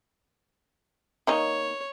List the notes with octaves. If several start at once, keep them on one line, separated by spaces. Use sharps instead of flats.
D#3 A#3 D#4 C#5